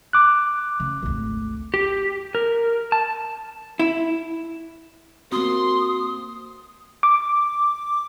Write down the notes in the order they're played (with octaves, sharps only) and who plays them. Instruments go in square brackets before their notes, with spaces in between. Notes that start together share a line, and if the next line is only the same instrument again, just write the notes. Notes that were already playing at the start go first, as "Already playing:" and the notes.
[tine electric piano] D6 F#6
[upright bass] C#3
G#1 D2
[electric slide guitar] G4
A#4
A5
[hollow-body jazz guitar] E4
[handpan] A#3 C4 [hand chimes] F#4 [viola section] C6 [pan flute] D#6
[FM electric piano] D6